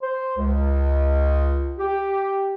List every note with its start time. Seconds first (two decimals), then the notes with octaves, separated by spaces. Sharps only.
0.02 C5
0.37 C#2
1.79 G4